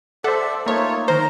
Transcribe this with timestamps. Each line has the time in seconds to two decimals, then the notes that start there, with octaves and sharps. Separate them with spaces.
0.24 A4 C5 D5 E5 F#5
0.66 A3 A#3 D#4 F4 C#5
1.08 D#3 A#4 C5 A#5